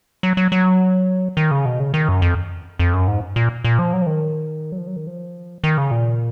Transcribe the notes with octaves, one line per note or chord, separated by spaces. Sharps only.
F#3
F#3
F#3
D#3
C#3
B2
C#3
D#3
F#2
F2
F2
F#2
G#2
A#2
A#2
F3
F#3
F3
D#3
F#3
F3
F#3
D#3
F3
D#3
C#3
A#2